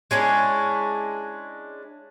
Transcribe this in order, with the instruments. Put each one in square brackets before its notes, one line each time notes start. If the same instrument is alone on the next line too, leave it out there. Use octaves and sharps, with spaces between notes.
[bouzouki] G#3 C#4 D4 E4